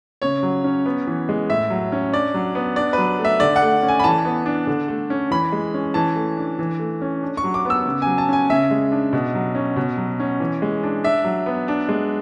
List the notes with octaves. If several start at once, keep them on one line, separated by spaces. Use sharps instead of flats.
C#3 C#5
F#3
C#4
B3
E3
G#3
A2 E5
F#3
C#4
D4 D5
F#3
B3
D4 D5
F#3 B4
A3
E5
D3 D5
F#5
A3
C#4
G#5
B5
E3 A5
B3
D4
D3
A3
C#4
E3 B5
G#3
C#4
E3 A5
A3
D4
E3
A3
C#4
D4
C#6
F#3
D6
B3 E6
C#3
F#3 G#5
A5
C#4 G#5
C#3 E5
G#3
D4
B2
F#3
C#4
B2
F#3
C#4
E3
G#3
D4
D4 E5
F#3
B3
D4
G#3